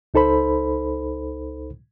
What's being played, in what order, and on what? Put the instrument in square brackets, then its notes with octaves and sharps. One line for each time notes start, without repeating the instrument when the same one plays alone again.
[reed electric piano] C#2 D#4 A4 C5 B5